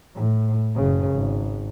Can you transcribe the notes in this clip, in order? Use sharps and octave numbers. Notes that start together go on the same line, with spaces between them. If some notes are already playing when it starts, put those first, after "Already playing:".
A2
F#1 C#3
G#1